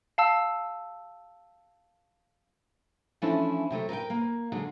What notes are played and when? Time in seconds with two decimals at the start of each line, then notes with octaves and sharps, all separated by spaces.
0.18 F5 A5 E6
3.22 E3 F3 A3 C#4 D4 E4
3.71 C3 F#3 G#3 A3
3.89 A#4 B4 F#5 G5
4.10 A#3
4.52 D3 F#3 G#3 C#4